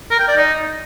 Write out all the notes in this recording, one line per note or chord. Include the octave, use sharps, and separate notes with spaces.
A#4
G5
D5
D#4